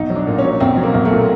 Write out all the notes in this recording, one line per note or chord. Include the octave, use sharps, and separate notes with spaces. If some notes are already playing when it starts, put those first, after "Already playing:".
Already playing: B1 D#4
F#3
D4
A#2
C#4
F#3
B1 C4
F#3
A#3
B1
A3
A#2